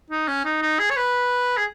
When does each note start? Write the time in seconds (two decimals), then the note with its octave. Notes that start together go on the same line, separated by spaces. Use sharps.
0.10 D#4
0.28 C#4
0.45 D#4
0.62 D#4
0.79 G#4
0.90 C#5
0.96 B4
1.57 G#4